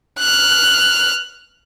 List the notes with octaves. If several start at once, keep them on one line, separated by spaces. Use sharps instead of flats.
F6 F#6